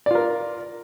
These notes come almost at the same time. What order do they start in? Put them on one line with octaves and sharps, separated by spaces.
D5 F4 A#4